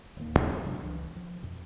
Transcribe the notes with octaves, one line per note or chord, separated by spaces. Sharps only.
D1 D#2 A#3
D#2
C3 F#3 C#4 D4
C#2 E3
F3
F2 B2